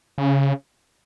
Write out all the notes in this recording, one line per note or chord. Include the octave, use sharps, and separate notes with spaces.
C#3